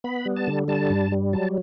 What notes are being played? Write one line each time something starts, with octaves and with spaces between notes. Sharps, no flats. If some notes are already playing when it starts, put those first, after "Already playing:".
B3 B5
G3
A5
D3
G3 A5
G2
G3
F#3 A5